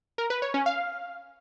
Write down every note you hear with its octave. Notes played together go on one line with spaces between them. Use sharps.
A#4
B4
C#5
C#4
F5